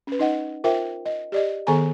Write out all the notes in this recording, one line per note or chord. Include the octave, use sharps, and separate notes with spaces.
C#4 B4
D#4 D#5 F#5
F4 A#4 C5 E5 G5
D#5
G4 D5 D#5
D#3 B3 G#4 A4 G#5 A#5